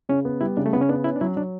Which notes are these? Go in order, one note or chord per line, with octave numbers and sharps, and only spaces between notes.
C#3 C#4
B3
G3 E4
C#3 D4
A3
C#3 B3
C#4
B3 D4
C#4 E4
D4
F#3 E4
F#3 D4